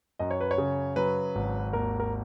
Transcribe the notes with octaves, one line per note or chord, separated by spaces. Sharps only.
F#2 D#5
C#5
B4
C#5
C#3
F#3 B4
G#1
D#2 A#4
A#4